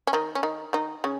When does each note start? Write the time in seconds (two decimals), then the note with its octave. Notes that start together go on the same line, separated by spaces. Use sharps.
0.07 C#4
0.13 D#3 D#4
0.35 C#4
0.43 D#3 D#4
0.73 D#3 D#4
1.04 C#3 C#4